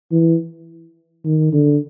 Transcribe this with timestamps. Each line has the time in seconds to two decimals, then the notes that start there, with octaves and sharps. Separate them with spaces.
0.12 E3
1.25 D#3
1.53 D3